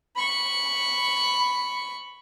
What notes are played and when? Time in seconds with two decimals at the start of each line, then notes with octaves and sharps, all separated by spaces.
0.16 B5 C#6